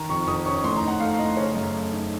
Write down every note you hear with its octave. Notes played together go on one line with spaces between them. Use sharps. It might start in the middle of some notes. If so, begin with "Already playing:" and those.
Already playing: D#3 A#5
F2 C#6
F2 D#6
C#4 C#6
A2 C6
A#5
D#4
F#5
A3 F5
A2 D#5
C#3 C#5
F#2
A3
D#4